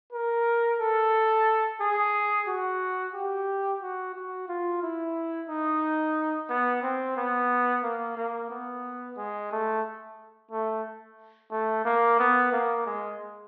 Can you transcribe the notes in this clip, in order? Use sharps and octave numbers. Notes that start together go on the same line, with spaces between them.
A#4
A4
G#4
F#4
G4
F#4
F#4
F4
E4
D#4
B3
C4
B3
A#3
A#3
B3
G#3
A3
A3
A3
A#3
B3
A#3
G#3